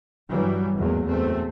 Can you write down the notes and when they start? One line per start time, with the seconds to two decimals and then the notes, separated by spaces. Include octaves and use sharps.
0.28 G2 E3 F#3 G3
0.76 G#1 E2 A2 F#3 A#3
1.05 F#1 E2 A3 C4